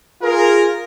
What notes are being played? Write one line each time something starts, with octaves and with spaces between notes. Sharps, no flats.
F4 G#4 A#4